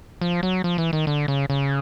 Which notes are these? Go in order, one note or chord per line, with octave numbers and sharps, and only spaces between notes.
F3
F#3
F3
E3
D#3
D3
C#3
C#3